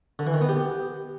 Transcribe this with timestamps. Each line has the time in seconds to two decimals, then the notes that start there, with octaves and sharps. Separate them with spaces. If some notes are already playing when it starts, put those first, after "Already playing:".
0.19 D3
0.27 E3
0.34 D#3
0.41 B3
0.49 G4